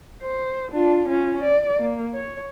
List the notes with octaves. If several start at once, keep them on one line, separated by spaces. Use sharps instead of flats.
C5
D4 F4
C#4 F4
D5
A#3
C#5